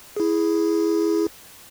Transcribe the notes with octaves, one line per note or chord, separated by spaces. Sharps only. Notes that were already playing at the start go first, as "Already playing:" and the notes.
E4 G#4